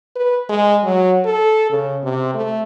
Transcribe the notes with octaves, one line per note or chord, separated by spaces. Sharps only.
B4
G#3
F#3
A4
C#3
C3
A3